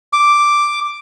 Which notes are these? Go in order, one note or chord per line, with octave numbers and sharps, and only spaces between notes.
D6